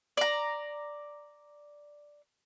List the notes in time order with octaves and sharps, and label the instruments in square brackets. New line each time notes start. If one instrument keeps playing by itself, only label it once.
[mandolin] D5 A#5